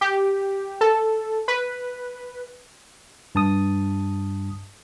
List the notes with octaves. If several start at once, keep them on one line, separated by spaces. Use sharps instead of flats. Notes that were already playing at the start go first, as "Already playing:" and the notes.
G4
A4
B4
G2 A5 D#6